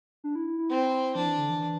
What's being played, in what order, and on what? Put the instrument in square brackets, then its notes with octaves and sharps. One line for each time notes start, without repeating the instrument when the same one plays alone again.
[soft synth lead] D4
E4
E4
E4
[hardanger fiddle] C4
[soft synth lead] F3 [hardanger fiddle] D4
[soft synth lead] E3
D3
E3